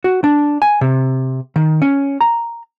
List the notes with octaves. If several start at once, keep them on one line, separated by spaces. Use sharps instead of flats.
F#4
D4
G#5
C3
D#3
C#4
A#5